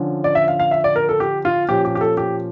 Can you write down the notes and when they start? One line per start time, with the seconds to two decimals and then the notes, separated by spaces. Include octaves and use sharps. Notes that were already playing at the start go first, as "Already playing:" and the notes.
Already playing: D3 F3 C#4
0.24 D5
0.35 E5
0.48 F5
0.60 F5
0.71 E5
0.84 D5
0.96 A#4
1.09 A4
1.20 G4
1.45 F4
1.69 A#2 F3 C#4 G4
1.85 G4
1.95 G4
2.01 A4
2.17 G4